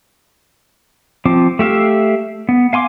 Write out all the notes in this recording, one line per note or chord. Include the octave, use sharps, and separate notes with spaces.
F3 C4 D6
A3 G4 E5 F5
B3
F5 G#5 C6 D6